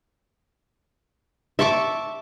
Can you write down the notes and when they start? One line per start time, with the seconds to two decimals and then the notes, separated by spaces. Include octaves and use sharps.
1.59 E5 A5 C#6 D6